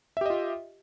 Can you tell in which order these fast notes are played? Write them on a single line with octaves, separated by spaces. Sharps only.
E5 G4 D#5 F4